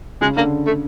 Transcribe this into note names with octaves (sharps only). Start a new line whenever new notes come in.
C#3 G#3
D3 A#3
A3